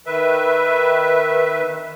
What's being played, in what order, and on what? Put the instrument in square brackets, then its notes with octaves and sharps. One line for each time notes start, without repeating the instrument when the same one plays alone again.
[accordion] D#3 B4 E5